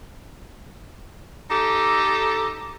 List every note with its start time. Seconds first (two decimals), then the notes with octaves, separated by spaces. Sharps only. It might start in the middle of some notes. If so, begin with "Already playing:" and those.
1.50 D#4 G4 A4